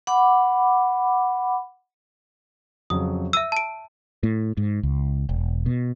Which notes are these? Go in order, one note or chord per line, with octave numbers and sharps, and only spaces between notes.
F#5 B5 D6
F2 C#3 F#3 D#6
E5 E6 D#7
A5 D7
A2
G#2
C#2
E1
B2